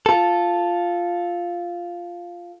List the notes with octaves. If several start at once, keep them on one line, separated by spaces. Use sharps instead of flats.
F4 A4